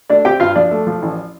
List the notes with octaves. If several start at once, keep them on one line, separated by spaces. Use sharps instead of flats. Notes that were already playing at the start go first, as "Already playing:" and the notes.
A3 D4 D5
C4 G4 G5
G2 F4 F5
F3 D4 D5
A3
F3
A1